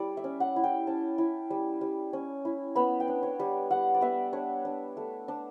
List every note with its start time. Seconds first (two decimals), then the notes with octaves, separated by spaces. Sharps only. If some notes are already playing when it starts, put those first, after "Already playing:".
Already playing: G3 E4 D5
0.17 E5
0.24 C#4
0.40 F#5
0.56 E4
0.63 G5
0.87 C#4 A5
1.18 E4
1.50 G3
1.81 G3
2.13 C#4
2.45 E4
2.75 B3 B5
3.00 G5
3.08 D4
3.23 C#5
3.40 G3
3.71 G3 F#5
3.94 D5
4.01 B3 E5
4.33 D4 C#5
4.65 D4
4.97 A3
5.28 D4